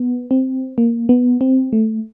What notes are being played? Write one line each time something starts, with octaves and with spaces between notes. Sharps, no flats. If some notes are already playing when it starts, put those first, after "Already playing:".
Already playing: B3
C4
A#3
B3
C4
A3